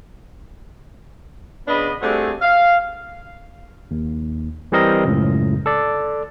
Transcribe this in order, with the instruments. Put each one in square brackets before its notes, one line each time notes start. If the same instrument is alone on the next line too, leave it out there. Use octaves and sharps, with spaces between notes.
[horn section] C#3 B3 D4 D#5 B5
G3 A3 C4 D4 F#4 G#4
F5
[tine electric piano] D#2
E3 G3 C4 A#4 D#5
C#2 F#2 A2
A4 D5